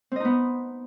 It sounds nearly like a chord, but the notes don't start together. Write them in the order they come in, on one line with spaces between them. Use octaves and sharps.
C4 D#5 D#4 B3